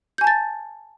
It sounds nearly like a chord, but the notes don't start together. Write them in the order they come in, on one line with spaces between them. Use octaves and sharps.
G6 G#5 A5 A6